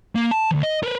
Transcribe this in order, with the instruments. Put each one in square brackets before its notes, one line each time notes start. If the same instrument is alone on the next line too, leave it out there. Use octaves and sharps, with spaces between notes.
[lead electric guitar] A#3
A5
D2 E3
D#5
A#4 B4